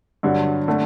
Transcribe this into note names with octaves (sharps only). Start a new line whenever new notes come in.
G2 D3 F#3
D3 A3